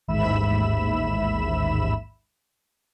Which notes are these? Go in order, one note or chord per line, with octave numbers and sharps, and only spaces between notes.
A1 D#2 G#2 E5 B5 E7